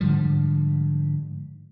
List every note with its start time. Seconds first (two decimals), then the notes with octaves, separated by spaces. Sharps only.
0.01 G#2 D3 F3 G3